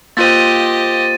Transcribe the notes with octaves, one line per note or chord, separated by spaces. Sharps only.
A#3 F4 G4 C5 D#5 A6 D#7